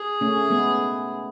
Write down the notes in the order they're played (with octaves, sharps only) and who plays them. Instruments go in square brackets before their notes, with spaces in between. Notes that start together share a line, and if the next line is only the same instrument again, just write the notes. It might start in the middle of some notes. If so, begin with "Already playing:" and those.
Already playing: [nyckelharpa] G#4
[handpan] A3 C#4
G#3 B3